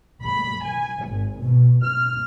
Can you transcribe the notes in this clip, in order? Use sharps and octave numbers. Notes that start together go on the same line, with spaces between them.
B5
G#5
G#1
B2
F6